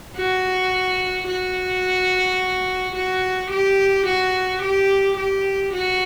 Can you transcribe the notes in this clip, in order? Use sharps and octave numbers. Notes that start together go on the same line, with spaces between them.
F#4
F#4
F#4
G4
F#4
G4
G4
F#4